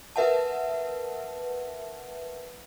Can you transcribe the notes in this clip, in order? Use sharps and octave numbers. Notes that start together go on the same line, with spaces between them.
A#4 B4 E5 F#5 A5